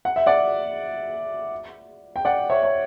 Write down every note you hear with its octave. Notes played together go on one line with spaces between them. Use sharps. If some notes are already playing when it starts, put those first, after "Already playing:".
F#5
E5
D5 F#5
G5
D5 F#5
C#5 E5
C#5